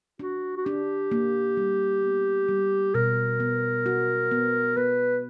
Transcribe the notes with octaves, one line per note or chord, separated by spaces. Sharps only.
D4 F#4
F#4
D4 G4
A#3
G3
B3
G3
B2 A#4
B3
F#4
B3
B3 B4